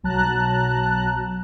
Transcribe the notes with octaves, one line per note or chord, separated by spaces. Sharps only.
B1 F#3 A5 A#5 F#6